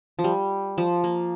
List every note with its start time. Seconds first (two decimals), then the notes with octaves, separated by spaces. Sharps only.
0.19 F3
0.24 G3
0.78 F3
1.04 A#3